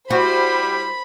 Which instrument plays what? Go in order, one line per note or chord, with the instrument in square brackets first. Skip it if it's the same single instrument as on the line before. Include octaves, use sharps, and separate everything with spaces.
[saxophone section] G3 E4 [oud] F#4 [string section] C5 [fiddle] B5